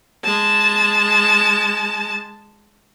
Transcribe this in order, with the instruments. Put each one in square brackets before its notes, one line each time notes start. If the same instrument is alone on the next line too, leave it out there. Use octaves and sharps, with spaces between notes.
[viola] G#3 A5